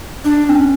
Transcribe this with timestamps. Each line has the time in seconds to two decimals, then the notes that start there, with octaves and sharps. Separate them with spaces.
0.25 D4
0.49 C4
0.55 C#4